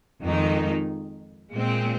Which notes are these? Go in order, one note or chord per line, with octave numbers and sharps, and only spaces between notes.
F2 D#3 G#3 D#4
A#2 G#3 C4